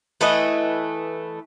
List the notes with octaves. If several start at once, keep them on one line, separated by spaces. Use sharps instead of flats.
E3 A3 B4 D#5